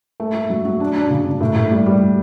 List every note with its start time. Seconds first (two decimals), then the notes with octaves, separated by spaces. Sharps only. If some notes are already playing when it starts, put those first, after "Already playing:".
0.20 A3
0.35 A3
0.50 F#3
0.65 F#3
0.80 D4
0.96 D4
1.11 C#3
1.25 D4
1.41 A2
1.56 A2
1.71 G3
1.86 G3